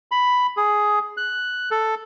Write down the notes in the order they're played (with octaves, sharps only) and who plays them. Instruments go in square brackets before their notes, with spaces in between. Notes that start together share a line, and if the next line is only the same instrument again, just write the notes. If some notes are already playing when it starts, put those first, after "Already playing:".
[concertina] B5
G#4
F#6
A4